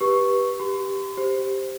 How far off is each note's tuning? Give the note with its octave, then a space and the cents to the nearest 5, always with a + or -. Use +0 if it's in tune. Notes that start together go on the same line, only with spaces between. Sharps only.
G4 +0 B4 -20 C#6 +0
G4 +0 C6 -45
G4 +0 C5 +0